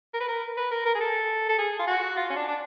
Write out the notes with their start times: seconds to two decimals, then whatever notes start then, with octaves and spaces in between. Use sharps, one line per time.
0.14 A#4
0.20 B4
0.28 A#4
0.57 B4
0.71 A#4
0.85 A#4
0.95 G#4
1.00 A4
1.49 A4
1.58 G#4
1.79 F4
1.87 F#4
2.17 F4
2.30 C#4
2.36 D4
2.48 D4